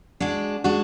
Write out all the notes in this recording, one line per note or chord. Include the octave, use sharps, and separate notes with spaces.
G#3 D4 F#4
G#3 D4 F#4